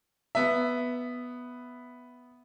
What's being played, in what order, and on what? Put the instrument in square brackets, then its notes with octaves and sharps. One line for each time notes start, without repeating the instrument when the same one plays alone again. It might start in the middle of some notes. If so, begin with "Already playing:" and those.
[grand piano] B3 E5